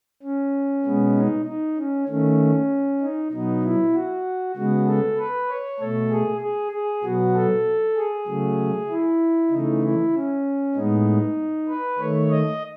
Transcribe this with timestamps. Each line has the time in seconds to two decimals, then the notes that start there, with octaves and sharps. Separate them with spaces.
0.23 C#4
0.84 B2 G#3 B3
1.15 D#4
1.46 D#4
1.77 C#4
2.08 D#3 A3 C#4
3.01 D#4
3.32 B2 F#3 B3 D#4
3.63 E4
3.94 F#4
4.56 C#3 G#3 B3 F#4
4.86 A4
5.18 B4
5.48 C#5
5.80 B2 A3 A4
6.11 G#4
6.41 G#4
6.72 G#4
7.03 B2 F#3 B3 F#4
7.35 A4
7.96 G#4
8.27 C#3 F#3 A3
8.89 E4
9.51 C#3 E3 A3 D#4
9.82 E4
10.13 C#4
10.75 A2 G#3 B3 D#4
11.68 B4
11.98 D#3 A3 C#5
12.30 D#5